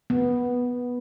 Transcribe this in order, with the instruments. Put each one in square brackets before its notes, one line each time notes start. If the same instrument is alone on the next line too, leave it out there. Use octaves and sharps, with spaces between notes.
[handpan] B3